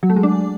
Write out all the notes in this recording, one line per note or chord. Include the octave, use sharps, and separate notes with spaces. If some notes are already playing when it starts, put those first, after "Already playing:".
F#3
A3
G#3
D4